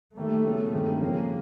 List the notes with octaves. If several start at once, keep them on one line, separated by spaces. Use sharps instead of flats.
D#3 G3 A3 A#3
C#3 F#3 B3
G2 D#3 G#3 A3 C4 D#4
F#2 C#3 F3 G#3 A#3 C#4